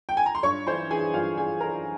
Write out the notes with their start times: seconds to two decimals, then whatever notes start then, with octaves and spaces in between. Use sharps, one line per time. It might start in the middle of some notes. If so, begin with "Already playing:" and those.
0.09 G5
0.17 G#5
0.26 A#5
0.35 C6
0.43 G2 C#5 C#6
0.67 E3 C5 C6
0.91 E3 G#4 G#5
1.14 G2 F4 F5
1.37 G2 G#4 G#5
1.61 E3 A#4 A#5